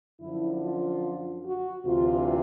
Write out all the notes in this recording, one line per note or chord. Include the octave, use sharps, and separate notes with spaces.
F#2 D3 F3 E4
F4
F#4
D2 C3 E3 F4